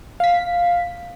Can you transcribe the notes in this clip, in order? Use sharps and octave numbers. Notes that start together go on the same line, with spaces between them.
F5 B6